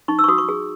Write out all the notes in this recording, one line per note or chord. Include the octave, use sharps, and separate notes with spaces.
D#4 C#6
E6
C#6
F#4 D#6
C#6
G#4